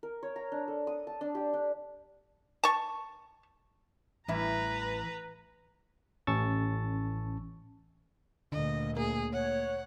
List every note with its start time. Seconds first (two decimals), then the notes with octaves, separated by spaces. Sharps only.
0.03 A#4
0.23 C#5
0.36 A#5
0.52 D4
0.68 A4
0.87 D#6
1.07 A5
1.21 D4
1.35 G4
1.53 D4
2.64 A5 C#6
4.28 A1 E3 G3 E4 B4 E5 A#5
6.27 A1 C#4 A5 C#6 E6 A6
8.52 D2 A#2 D3 D#5
8.97 A#3 G#4
9.33 C#5 F#5